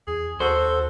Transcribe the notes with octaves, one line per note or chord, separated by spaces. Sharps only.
E2 G#4
D#2 F#4 A4 C5